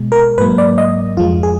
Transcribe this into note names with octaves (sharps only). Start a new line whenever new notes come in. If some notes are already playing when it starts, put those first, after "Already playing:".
Already playing: B2 G#3
A#4
G#2 F#3 A#3 B4
D5
D#5
F2 F3 G#3 F4
G#4